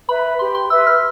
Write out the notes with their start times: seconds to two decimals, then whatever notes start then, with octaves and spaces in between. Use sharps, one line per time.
0.09 B4 E5 B5
0.39 G4 C6
0.55 C6
0.70 B4 E5 E6
0.86 F6